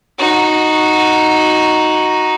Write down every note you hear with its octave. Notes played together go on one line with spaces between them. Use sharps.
D#4 F#4